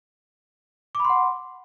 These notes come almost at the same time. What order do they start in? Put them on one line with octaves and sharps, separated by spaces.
D6 B5 C6 F#5